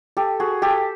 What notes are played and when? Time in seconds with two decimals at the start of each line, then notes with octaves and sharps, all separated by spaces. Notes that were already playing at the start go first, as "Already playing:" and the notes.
0.17 G4 A4
0.40 F#4 G#4
0.62 G4 A4